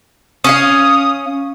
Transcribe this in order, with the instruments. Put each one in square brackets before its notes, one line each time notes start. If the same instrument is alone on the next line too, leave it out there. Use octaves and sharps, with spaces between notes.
[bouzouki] C#4 C#5 F5 [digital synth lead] D#6